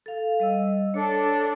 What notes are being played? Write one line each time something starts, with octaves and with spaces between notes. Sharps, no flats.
A4 F5
G3 D#5 E6
D4 A4 C#5 D5